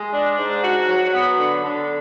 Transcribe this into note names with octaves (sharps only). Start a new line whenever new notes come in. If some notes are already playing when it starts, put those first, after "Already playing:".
Already playing: G#3
D4
G#2
F#4
F#3
B3
D3
D3